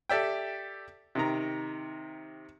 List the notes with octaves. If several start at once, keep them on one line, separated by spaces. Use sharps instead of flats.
G4 A4 D5 E5 G5
C3 D#3 A#5